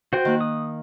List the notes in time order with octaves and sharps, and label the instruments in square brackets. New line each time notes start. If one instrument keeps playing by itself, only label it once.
[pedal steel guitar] F#4 C5 G5
[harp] D#3 A#3 F#6
[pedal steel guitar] D#6